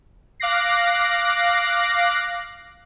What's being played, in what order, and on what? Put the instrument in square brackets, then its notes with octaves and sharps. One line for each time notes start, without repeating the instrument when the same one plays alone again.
[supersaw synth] F5 D6 F#6 A#6 C7